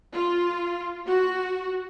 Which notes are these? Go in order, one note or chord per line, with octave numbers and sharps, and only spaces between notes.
F4
F#4